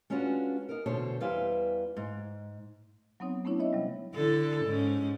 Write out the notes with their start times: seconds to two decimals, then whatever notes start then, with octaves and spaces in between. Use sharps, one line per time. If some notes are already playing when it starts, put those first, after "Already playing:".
0.10 G#3 C#4 D4 F4 F#4 B4
0.69 D#4 A#4
0.86 E2 B2 D3 C5 C#5 A5
1.20 E2 E3 G3 B4 C5 F5
1.97 G#2
3.20 F#3 B3 C4 D#4 C#5
3.45 A3 B3 C#4 D4 E4 C#5
3.59 C#5 D#5 E5 B5
3.73 C3 F#3 G3
4.14 D3 E4 A4
4.65 G#2 C#4